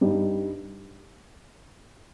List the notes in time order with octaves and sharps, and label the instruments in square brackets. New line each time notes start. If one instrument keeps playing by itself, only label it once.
[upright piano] G2 G3 D#4 G4